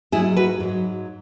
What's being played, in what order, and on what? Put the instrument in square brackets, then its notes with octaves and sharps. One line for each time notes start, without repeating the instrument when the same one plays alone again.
[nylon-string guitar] G#2 F#3 E4 G#4
F#4 B4
G#2 F#3